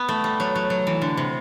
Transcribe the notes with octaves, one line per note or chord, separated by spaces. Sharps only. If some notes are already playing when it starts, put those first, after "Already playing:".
Already playing: B3
A3
G3
F#3
F#3
F#3
E3
D3
C3